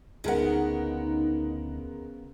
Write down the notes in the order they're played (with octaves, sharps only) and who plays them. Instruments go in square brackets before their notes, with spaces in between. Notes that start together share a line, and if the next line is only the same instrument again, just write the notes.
[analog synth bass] D2 [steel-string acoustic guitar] C#3 B3 [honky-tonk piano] G#3 A#4 F#5 [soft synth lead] D#4